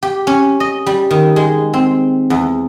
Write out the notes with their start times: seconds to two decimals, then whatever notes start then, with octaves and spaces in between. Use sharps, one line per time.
0.03 G4
0.27 C#4
0.60 D#5
0.86 G3
1.11 D#3
1.36 G#3
1.74 C4
2.30 E2